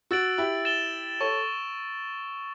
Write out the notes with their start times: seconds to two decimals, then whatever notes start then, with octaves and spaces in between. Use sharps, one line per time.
0.11 F#4 E6 A6 D7 F#7
0.38 E4 G4
0.65 A6 E7 G7
1.20 A4 C#5 C#6